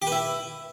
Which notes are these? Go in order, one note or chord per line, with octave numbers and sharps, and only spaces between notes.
G4
B4
E4